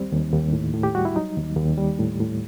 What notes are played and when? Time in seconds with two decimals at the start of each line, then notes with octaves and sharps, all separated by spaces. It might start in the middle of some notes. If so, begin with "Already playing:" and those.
Already playing: D#2 G3 C4
0.13 D#2
0.32 D#2
0.53 A2
0.74 A2
0.83 G4
0.95 G3 F#4
1.05 E4
1.16 F#3 D#4
1.37 D#2
1.57 D#2
1.78 G3
2.00 A2
2.20 A2